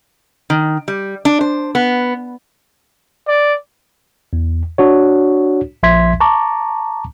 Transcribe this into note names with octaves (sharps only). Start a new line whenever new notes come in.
D#3
G3
D4
C5
B3
D5
E2
D4 F#4 C#5
A#1 F3 E5 C6 G#6 B6
A5 A#5 C#6 D6